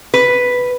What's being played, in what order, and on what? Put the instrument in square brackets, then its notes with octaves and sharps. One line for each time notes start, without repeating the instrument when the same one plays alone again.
[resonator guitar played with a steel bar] B4